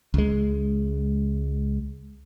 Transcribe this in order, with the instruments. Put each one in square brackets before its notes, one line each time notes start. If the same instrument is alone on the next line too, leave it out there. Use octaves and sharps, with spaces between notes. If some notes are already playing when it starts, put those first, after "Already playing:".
[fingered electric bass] C#2 G#3